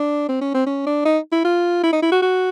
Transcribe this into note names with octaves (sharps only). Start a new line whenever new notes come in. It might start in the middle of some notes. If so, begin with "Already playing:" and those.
Already playing: D4
C4
C#4
C4
C#4
D4
D#4
E4
F4
E4
D#4
E4
F#4
F#4